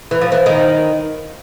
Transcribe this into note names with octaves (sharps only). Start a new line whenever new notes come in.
E3
F3
E3
D#3